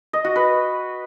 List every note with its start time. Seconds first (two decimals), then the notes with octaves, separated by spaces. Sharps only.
0.13 D#5
0.24 F#4
0.36 B4